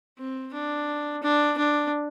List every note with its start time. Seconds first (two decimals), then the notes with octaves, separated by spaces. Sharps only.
0.18 C4
0.54 D4
1.23 D4
1.58 D4